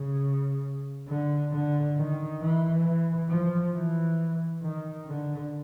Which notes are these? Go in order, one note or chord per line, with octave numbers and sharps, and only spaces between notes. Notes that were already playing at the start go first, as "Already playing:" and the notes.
Already playing: C#3
D3
D3
D#3
E3
E3
F3
E3
D#3
D3